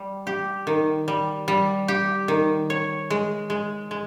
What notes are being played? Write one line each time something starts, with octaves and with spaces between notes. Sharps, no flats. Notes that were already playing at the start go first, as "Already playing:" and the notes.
Already playing: G3
G4
D#3
G3
G3
G4
D#3
C#5
G#3
G#3
G#3